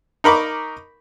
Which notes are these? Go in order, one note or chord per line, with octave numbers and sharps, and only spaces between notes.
D#4 A#4 B5 C#6 D6